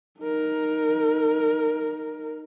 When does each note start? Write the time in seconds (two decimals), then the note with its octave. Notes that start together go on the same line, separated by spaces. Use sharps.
0.20 D#4 A#4